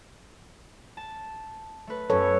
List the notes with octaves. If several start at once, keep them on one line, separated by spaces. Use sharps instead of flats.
A5
A3 B4
F#2 C#4 A4 B4 C#5